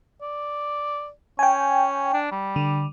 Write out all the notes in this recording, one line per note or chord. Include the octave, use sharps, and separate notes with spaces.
D5
C#4 G5 G#5
D4
G3
D3